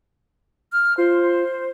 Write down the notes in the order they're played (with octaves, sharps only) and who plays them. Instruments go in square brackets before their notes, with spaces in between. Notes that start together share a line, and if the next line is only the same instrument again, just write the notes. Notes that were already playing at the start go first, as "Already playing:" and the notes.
[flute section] F6
[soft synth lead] F4 [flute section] C5